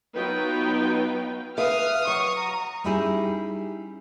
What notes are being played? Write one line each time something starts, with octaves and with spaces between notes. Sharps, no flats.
F#3 B3 D#4 F4 B4 G5
B4 E5 F5 D#6 F6
F#3 C#6
A#5
G3 C#4 D#4 E4 G4 G#4